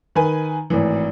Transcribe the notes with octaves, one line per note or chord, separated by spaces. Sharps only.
D#3 B4 G#5
G#1 A2 E3